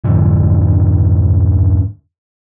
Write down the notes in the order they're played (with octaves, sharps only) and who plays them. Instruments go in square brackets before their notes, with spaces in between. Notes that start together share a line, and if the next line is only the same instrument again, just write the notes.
[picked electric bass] F2 G#2 D3 F3